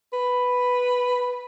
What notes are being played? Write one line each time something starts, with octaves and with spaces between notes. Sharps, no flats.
B4